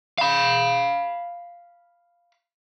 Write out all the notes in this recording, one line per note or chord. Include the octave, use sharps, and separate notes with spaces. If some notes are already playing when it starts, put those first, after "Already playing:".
F5 B5